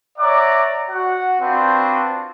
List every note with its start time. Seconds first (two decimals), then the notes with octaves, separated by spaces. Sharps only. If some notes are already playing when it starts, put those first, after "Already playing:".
0.18 C#5 D5 E5 F#5 A#5 D6
0.90 F#4 F#5
1.40 C4 D4 F4 F#4 B4 C5